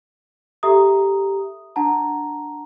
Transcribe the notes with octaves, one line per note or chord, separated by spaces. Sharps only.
G4 A4 E5 A#5 D#6
D4 F#5 A5 A#5